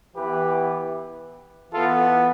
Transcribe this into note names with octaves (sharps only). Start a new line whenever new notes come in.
E3 B3 G4 B4
E3 B3 F4 A4